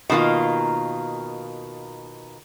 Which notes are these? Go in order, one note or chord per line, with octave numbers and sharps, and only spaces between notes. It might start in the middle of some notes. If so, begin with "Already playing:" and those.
B2 D#3 F#3 A#3 F4